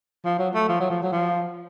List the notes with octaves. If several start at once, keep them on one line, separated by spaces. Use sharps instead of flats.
F3
F#3
A3
F3
F#3
F3
F#3
F3